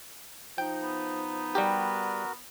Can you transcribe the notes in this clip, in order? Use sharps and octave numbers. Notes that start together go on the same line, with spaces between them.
F3 D#4 G5
B3
G3 F#4 G4 A#4